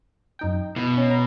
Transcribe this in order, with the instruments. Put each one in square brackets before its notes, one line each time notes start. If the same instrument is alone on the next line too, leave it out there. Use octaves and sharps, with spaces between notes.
[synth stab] F#2 D#4 G5
[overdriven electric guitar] B2 [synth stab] E4
[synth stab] C#4
A#5